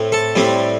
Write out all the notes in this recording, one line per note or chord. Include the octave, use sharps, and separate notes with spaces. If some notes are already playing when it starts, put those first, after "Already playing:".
Already playing: A2 A3 C4
A4
A2 G3 C4